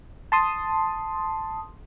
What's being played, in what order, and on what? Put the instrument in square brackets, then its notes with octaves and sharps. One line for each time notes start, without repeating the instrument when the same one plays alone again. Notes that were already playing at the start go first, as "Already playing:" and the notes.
[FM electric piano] A5 C6 D#6